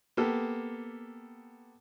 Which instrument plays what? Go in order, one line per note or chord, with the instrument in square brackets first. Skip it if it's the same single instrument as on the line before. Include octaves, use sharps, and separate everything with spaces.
[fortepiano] A#3 B3 G4 A4